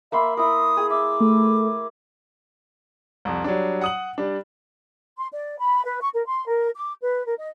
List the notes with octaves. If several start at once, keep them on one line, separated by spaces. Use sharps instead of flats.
A#3 E5 B5 C6
E4 A#4 D#6
G#4
E5 D6
A3
C2 F2
F#3 G3 D4
F#5 D#6 F#7
G3 D4
C6
D5
B5
B4
C#6
A#4
C6
A#4
D6
B4
A#4
D#5